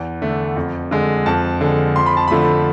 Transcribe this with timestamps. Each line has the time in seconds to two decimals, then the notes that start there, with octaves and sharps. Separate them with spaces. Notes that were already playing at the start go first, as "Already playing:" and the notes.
Already playing: E2
0.22 D3 A3
0.56 F2
0.91 D3 G#3
1.26 F2 A5
1.61 D3 G#3
1.96 F2 C6
2.06 B5
2.17 A5
2.28 D3 F3 A3 B5